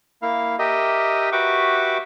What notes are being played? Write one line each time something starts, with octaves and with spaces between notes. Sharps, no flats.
A#3 E4 F5
G4 A#4 D#5 E5
F#4 G4 B4 E5 C#6 D6